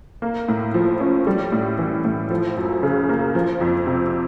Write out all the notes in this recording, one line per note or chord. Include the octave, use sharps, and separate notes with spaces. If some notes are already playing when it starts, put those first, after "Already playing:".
A#3
A2
F3
C#4
G3
A2
E3
A2
F3
F#2
C#3
A#3
F3
F2
C3